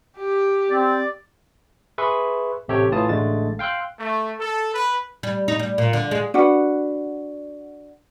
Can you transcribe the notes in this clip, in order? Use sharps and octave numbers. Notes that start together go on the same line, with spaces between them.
G4
C4 D5
G#4 B4 E5 C6 C#6
A1 C3 G4 A4 C#5 G5
A2 E3 F4 A5 D#6
A1 D3 G#3 A3 A6
F5 G5 C6 E6 F#6
A3
A4
B4
G3
D#4
G3
A#2
D3
G#3
D4 F#4 B4 F#5